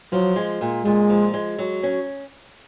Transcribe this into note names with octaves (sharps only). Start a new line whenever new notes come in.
F3 F#3
G#3
A#2
A#2 G#3
F3
G#3
F#3
C#4